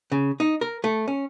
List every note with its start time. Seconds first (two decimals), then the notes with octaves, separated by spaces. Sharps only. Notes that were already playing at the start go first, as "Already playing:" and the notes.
0.12 C#3
0.40 D#4
0.61 A#4
0.84 A3
1.08 C#4